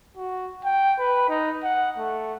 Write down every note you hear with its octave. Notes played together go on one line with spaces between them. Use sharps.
F#4
G5
B4
D#4
F#5
A3